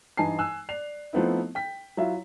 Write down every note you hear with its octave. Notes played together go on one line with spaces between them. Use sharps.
G2 E3 D#4 G#5 A5 C7
G#5 E6 F#6
D5 C7 F7
F3 A3 B3 C4 D#4 E4
G5 B6
F#3 E4 F4 E5